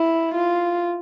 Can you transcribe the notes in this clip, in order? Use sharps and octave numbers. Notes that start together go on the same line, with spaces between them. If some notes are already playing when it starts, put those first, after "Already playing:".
Already playing: E4
F4